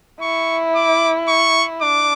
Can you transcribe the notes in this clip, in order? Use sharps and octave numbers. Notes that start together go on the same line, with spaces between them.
E4 C#6
D6
C#6
D4 D6